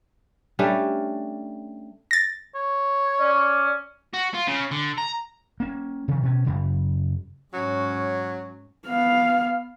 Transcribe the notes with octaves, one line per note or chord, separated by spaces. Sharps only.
G3 A3 C#4 D4
A6 A#6
C#5
C#4 D5
F#4
F4
C#3
D3
A#5
A#3 C#4
C3 D#3 F3
B2 C#4
F#2 C#3
G#2 F#3 C#4
B3 F5